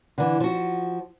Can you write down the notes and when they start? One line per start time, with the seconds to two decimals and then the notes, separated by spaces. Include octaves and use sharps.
0.18 D3 E3
0.40 F3 F#4